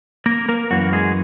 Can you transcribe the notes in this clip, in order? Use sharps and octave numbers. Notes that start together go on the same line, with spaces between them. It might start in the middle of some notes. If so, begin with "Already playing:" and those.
A#3 A#4
A#3 A#4
F#2 E3 A#3 F#4
G#3 G#4